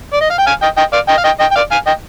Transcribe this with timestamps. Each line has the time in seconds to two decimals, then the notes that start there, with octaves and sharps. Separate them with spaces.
0.13 D5
0.21 D#5
0.30 F5
0.39 G5
0.47 F5 G#5
0.62 D#5 G5
0.77 D#5 G5
0.93 D5 F5
1.09 D#5 G5
1.18 F5
1.24 D#5 G5
1.40 D#5 G5
1.51 G5
1.55 D5 F5
1.72 F5 G#5
1.87 D#5 G5